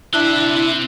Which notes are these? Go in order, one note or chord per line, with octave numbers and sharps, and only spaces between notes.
C4 D4 E4 E5 F#6